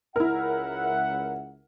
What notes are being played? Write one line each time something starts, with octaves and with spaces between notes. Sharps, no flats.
C#2 E4 A#4 E5 F#5